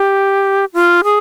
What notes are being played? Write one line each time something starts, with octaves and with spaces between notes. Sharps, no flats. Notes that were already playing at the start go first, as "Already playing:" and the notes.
Already playing: G4
F4
G#4